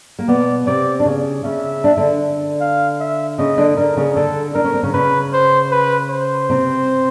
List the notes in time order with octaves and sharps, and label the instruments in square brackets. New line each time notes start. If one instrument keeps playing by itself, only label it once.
[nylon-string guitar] A#3
[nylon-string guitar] B2 B3 [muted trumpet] D5
[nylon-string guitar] C3 C4 [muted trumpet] D5
[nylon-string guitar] D4
C#3 C#4
[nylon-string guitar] C#3 C#4 [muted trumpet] E5
[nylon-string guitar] D4
D3 D4
[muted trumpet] F5
E5
[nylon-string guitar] C#3 C#4 [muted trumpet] D#5
[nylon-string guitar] D3 D4
[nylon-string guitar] D3 D4 [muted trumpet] A#4
[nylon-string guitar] C#3 C#4
[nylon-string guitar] D3 D4 [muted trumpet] A4
[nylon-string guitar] D4 [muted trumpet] A#4
[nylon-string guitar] C#4
C4
C#3 C#4
[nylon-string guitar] C#3 C#4 [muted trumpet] B4
[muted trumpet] C5
B4
C5
[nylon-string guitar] C3 C4